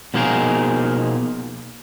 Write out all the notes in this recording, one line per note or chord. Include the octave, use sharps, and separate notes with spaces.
B2 F3 A#3 D#4 G#4 A#4